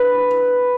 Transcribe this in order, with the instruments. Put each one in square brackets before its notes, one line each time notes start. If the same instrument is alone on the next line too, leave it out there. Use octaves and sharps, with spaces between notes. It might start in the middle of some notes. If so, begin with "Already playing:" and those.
Already playing: [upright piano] B4